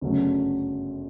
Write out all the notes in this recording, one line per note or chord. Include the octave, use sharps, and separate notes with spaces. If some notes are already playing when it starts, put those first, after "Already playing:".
G1 F#2 C#3 F#3 A3